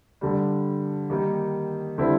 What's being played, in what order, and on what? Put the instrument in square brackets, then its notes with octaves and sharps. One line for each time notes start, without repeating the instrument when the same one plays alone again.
[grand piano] G2 D3 G3
D#3 G3 A#3 D#4
D3 G3 C4 E4